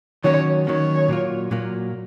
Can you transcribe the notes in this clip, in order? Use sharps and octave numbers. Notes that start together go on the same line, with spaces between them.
D#3 F#3 A#3 C#4 C#5
D#3 F#3 A#3 C#4 C#5
A#2 F#3 A#3 F4
A#2 F#3 A#3 F4